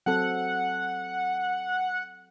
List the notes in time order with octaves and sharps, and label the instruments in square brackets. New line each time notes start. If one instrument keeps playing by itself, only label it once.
[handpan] F#3 C4 A4 [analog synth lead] F#5